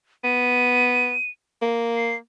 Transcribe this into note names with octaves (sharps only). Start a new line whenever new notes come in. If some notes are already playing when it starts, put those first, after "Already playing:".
B3 D#7
A#3
C7